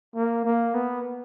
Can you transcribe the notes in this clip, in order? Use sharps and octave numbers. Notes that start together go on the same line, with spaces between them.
A#3
A#3
B3